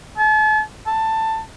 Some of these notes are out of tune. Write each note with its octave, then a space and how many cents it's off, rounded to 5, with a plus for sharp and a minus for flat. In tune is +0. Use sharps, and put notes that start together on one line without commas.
A5 -40
A5 +15